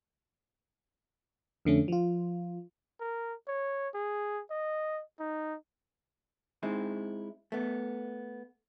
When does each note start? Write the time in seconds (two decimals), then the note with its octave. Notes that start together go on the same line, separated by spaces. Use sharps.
1.65 F2 D3 A3 C#4
1.88 F3 F4
3.00 A#4
3.47 C#5
3.94 G#4
4.50 D#5
5.20 D#4
6.63 G#3 C4 D#4 E4
7.52 A3 B3